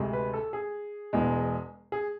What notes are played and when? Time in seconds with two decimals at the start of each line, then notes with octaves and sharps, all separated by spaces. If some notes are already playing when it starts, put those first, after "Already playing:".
Already playing: D2 C3 G#3
0.13 B4
0.33 A4
0.53 G#4
1.13 E1 E2 B2 G#3
1.92 G#4